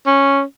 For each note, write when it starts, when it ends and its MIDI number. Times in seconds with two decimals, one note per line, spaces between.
0.06 0.42 61